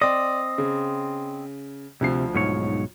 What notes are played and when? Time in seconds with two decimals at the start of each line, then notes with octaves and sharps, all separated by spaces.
0.02 C4 D5 D#5
0.58 C#3
2.01 D2 C3 F3 C7
2.35 B1 G#2 C#5